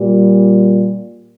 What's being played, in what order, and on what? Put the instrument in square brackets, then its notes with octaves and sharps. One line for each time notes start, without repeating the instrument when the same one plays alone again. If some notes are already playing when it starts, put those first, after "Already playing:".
Already playing: [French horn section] A#2 G3